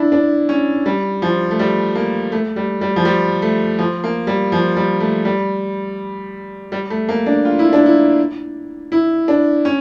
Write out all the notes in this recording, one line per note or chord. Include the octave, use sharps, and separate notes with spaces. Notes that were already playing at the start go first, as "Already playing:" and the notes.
Already playing: D4 E4
D4
C#4
G3
F3
A3
G3
A#3
A3
G3
G3
F3
G3
A3
F3
A#3
G3
F3
G3
A3
G3
G3
A3
A#3
D4
F4
E4
D4
E4
E4
D4
C#4